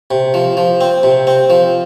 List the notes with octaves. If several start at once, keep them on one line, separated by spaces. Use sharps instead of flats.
C3
F3
F3
C4
C3
C4
F3